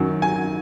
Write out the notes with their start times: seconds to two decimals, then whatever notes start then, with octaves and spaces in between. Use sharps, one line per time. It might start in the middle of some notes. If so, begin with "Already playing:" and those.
Already playing: F#2 D#3 F#3
0.22 G#5